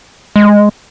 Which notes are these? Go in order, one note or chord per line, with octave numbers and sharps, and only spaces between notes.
G#3